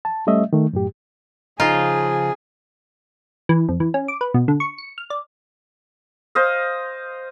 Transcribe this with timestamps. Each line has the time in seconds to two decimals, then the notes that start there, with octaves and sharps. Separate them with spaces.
0.05 A5
0.27 G3 A3 C#4 D#5 E5
0.53 D#3 A3
0.73 F#2 A2 G4
1.60 C#3 F3 D#4 F4 G#4
3.49 E3
3.69 F2
3.80 E3
3.94 C#4
4.08 D6
4.21 B4
4.34 B2
4.48 D3
4.60 C#6
4.78 C#7
4.98 F6
5.10 D5
6.35 C5 D#5 F5